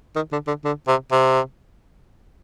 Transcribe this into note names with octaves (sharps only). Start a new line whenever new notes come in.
D#3
D3
D3
D3
C3
C3